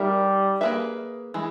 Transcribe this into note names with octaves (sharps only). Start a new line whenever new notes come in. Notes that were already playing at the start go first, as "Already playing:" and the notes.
Already playing: G3 D#4 A#4 E5
A#3 C#4 G#4 B4 E5
E3 G#3